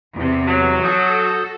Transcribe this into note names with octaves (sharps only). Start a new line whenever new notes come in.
E2 C3
F#3
F#4 A4 D#6 G6